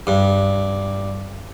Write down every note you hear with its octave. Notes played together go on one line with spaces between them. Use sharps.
G2